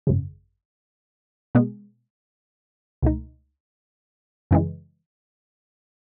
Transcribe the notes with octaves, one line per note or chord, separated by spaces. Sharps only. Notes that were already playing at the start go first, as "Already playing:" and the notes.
G#1 F#2 C#3
B2 G#3 B3
C#2 B2 A3 D#4
F#2 C#3 E3 G#3